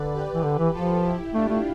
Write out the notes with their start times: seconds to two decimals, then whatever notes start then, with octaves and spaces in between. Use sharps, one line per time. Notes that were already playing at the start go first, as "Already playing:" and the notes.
Already playing: D3 B4 D5
0.14 G4 B4
0.34 E3
0.43 D3
0.58 E3
0.74 F3 F4 A4
1.04 E4 G4
1.33 A3 D4 F4
1.49 A3